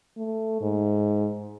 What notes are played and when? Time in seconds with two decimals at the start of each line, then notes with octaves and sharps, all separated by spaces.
0.17 A3
0.61 G#2